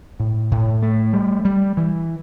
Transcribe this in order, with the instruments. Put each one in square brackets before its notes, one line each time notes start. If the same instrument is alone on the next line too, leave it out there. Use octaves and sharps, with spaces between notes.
[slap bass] A2
A2
A3
G3
G3
E3